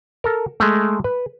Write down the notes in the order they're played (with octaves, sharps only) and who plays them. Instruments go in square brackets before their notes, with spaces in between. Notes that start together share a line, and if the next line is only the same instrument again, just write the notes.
[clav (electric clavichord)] A4 A#4
G#3 A3
B4